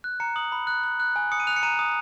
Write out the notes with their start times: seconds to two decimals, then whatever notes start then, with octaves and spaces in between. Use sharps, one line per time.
0.04 F#6
0.20 A#5 C#7
0.36 D#6 F#7
0.52 B5
0.67 F#6
0.84 F#6
1.00 F#6
1.16 G#5
1.32 D#6 C#7
1.40 D#7
1.47 F#6 F7
1.56 C#7
1.63 A#5 D#7
1.79 D#6